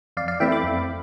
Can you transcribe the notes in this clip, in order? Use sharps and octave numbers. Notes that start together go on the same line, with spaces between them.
F2 D5 F5
D5 F5
E3 A3 C4 E4 E5 G5
B5 D6
F2